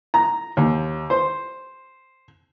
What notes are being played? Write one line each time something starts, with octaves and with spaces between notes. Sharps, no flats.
A#5
D#2
C5